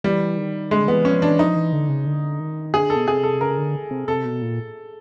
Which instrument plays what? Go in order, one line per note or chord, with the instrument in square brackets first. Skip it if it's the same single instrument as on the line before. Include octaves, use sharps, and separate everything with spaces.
[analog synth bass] E3 [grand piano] G3
[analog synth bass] D#3
[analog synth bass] D3 [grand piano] G#3
[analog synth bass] E3 [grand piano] B3
[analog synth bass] F3 [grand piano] C#4
[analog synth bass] E3 [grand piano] D4
[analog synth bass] F3 [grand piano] D#4
[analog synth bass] E3
D3
C#3
D3
D#3
[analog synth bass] D3 [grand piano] G#4
[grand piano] A4
[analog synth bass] B2
[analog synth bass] C3 [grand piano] G#4
[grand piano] A4
[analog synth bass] C#3 [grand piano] A#4
[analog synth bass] D3
C3
[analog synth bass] C3 [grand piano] A4
[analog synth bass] B2
A#2